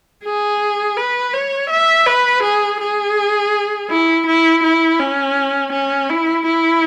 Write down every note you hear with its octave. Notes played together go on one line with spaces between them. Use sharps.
G#4
B4
C#5
E5
B4
G#4
G#4
E4
E4
E4
C#4
C#4
E4
E4